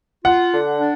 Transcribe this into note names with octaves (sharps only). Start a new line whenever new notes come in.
F4 F#5
D3
D4